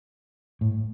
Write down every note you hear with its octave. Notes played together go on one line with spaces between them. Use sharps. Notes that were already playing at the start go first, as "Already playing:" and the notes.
A2